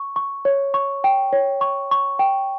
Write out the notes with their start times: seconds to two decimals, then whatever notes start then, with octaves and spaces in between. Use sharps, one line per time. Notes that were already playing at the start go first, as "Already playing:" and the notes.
Already playing: C#6
0.16 C#6
0.45 C#5
0.74 C#6
1.04 G5
1.33 C#5
1.61 C#6
1.91 C#6
2.19 G5